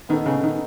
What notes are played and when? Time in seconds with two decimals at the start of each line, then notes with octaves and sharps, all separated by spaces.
0.09 D#3 B3 D#4 A4
0.26 C#3
0.43 D#3